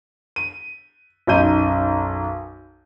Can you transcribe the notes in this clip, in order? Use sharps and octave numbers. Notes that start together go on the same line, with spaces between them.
D#7
B1 F#2 D#4 G6 D#7